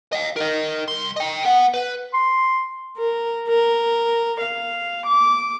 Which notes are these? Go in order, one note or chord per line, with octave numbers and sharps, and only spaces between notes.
D#5 F5
A#4 D#5
C2 C6
D#5 G5
B3 F#5
B4
C6
A#4
A#4
F5
D6